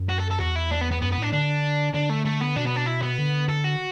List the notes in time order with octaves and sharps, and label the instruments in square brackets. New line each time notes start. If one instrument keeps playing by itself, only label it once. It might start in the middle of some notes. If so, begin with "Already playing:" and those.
Already playing: [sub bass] F#2
[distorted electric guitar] F#4
A4
A4
[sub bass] E2 [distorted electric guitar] F#4
[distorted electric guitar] E4
D4
B3
B3
[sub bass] F#2 [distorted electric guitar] B3
[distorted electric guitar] B3
[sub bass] A2 [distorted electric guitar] D4
[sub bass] D3 [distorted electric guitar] D4
[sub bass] D3 [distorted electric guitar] D4
[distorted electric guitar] A3
A3
B3
[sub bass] B2 [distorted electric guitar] D4
[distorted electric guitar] B3
D4
E4
B3
[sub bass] D3
[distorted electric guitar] A4
F#4